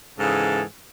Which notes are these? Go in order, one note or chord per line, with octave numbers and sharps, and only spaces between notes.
G#2 C#3 E3 G#4 A4